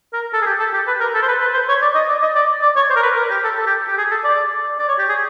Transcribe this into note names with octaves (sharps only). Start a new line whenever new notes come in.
A#4
A4
G#4
G4
A4
G4
B4
A#4
A4
C5
B4
B4
C5
C#5
D5
D#5
D5
D#5
D5
D5
C#5
C5
A#4
B4
A#4
G4
A4
A4
G4
G4
G#4
A4
D5
D5
C#5
G4
G#4